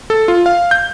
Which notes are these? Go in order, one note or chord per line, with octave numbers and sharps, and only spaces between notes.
A4
F4
F5
G6